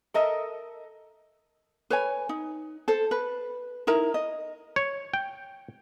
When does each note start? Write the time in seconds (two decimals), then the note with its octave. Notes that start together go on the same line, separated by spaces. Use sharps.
0.14 A4 A#4 D#5 E5
1.90 B4 C#5 G#5
2.29 D#4
2.88 A4 C5
3.11 B4
3.87 D#4 E4 A#4 A#5
4.14 D#5
4.76 C#5
5.14 G5